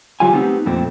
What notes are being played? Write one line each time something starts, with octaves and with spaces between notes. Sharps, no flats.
C#3 F#3 G3 F4 F5 G#5
A3 B3 C4 D#4 G4
F2 A#2 A3 C4